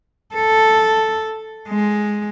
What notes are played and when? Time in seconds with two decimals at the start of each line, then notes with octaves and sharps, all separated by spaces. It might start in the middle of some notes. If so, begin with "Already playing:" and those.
0.35 A4
1.68 G#3